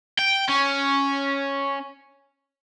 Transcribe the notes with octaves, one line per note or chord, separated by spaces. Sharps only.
G5
C#4